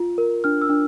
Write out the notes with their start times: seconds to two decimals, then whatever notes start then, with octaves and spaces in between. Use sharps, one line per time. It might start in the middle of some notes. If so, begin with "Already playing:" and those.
Already playing: F4
0.18 A#4
0.44 D4 F6
0.62 E6
0.70 D4